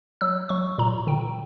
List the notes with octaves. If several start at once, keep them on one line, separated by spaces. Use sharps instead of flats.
F#3 E6
F#3 C#6
A#2 A#5
D3 G5